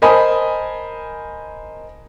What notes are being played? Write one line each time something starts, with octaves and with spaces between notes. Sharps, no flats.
A#4 C5 D#5 G#5 A5 B5